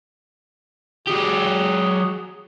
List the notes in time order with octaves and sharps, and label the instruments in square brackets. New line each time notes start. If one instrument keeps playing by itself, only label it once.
[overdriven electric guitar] F#3 G4 [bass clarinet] G#4